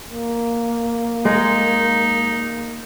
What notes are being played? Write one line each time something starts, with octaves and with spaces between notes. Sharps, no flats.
A#3
G#3 D#4